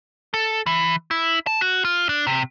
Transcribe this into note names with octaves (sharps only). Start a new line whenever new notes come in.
A4
E3
E4
A5
F#4
F4
D4
C3